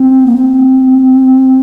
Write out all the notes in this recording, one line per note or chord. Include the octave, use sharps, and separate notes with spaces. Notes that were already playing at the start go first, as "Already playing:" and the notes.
Already playing: C4
A#3
C4